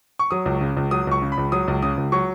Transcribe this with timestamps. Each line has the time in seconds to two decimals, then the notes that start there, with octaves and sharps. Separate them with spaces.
0.19 C#6
0.31 F#3 D#6
0.46 C#2
0.61 C#3
0.77 C#2
0.91 F#3 D#6
1.07 C#2 C#6
1.22 C#3
1.32 B5
1.37 C#2
1.52 F#3 D#6
1.68 C#2
1.82 C#3 D#6
1.97 C#2
2.12 F#3 C#6